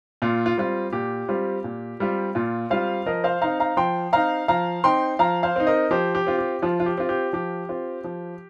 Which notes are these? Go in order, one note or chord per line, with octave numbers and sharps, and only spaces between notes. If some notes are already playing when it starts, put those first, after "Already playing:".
A#2 F4
F4
G3 C4 F4
A#2 G4
G3 C4 F4
A#2
G3 C4 F4
A#2 F4
G3 C4 F4 C5 F5
F3 A#4 D#5
C5 F5
C4 D#4 F5 A#5
F5 A#5
F3 G5 C6
C4 D#4 F5 A#5
F3 F5 A#5
C4 D#4 G5 C6
F3 F5 A#5
C5 F5
C4 D#4
A#4 D#5
F3 G4 C5
G4
C4 F4
G4
F3 F4
F4
G4
C4 F4
G4
F3 G4
C4 F4
F3